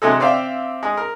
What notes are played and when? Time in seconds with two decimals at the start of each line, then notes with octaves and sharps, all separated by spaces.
0.02 C3 F#3 G#3 A4
0.20 C4 D5 E5 F5 G5
0.83 G#3
0.97 A#4